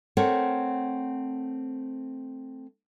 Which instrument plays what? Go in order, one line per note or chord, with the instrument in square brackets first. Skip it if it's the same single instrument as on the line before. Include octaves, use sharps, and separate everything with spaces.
[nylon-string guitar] A3 C4 A#4 C#5 F#5